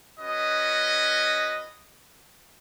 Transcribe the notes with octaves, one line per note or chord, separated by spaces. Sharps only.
C#4 F#4 B4 D#5